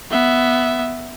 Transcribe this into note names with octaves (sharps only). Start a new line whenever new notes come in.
B3 E5